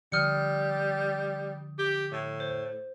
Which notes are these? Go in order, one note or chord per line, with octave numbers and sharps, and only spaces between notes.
D3 F3 G3 D#6 F6 C#7
G4
A2
C5